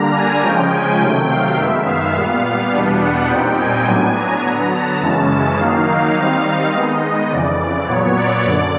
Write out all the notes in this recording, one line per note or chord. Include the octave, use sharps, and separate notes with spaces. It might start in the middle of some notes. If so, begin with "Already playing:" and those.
Already playing: D3 G3 A#3 D4 A#5
G#5
C#3 F3 G#3 C#4 G5
G#5
C3 D#3 F#3 A3 G5
F5
F#2 D#3 G#3 B3 E5
F5
A#2 G3 B3
E2 B2 G3 B3 D4
F#5
A#2 G3 C4 D#4 G5
G#5
A2 F#3 B3 D4
A#5
D3 F#3 B3
A5
F#2 C#3 E3 G#3 C#4
D#3 F#3 A#3 D#4 F5
D#3 G3 C4 D#4
D#3 G#3 B3 D#4 D#5
F2 C#3 E3 D5
A#2 F#3 B3 C#5
D5
F#2 D3 D5